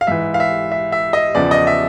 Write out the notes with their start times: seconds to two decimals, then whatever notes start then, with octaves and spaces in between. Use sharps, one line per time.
0.01 F5
0.07 G#2 E3 E5
0.34 F5
0.40 E5
0.72 E5
0.92 E5
1.13 D#5
1.35 E2 C#3 F3 D5
1.51 D#5
1.67 E5